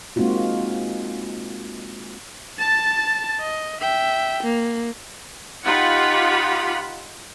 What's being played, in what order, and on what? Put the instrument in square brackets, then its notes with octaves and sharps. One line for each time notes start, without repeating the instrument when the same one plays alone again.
[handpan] G#3 A#3 C4 D#4 F4 F#4
[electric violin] A5 A6
D#5
E5 G5
A#3
[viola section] D#4 F4 G4 F#5 B5